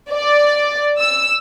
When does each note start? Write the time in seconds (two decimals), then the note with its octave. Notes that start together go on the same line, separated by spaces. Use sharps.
0.12 D5
0.99 E6